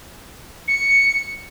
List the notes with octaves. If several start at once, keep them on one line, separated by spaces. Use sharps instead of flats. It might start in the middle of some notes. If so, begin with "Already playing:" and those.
C#7